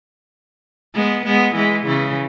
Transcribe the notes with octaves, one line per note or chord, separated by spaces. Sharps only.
G#3 B3
G#3 B3
E3 G#3
C#3 E3